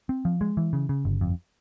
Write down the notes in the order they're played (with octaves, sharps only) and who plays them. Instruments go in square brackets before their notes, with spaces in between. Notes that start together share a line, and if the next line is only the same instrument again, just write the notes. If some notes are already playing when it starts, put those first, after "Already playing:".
[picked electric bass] C4
F3
G#3
E3
C#3
C#3
G1
F2